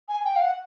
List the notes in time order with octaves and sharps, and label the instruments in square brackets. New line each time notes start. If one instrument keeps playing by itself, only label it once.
[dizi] G#5
G5
F5
F#5